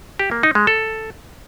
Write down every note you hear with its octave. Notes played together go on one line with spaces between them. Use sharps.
G4
A#3
D#4
G#3
A4